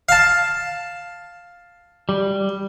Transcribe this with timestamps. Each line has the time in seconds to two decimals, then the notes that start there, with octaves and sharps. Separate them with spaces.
0.09 F5 A5
2.09 G3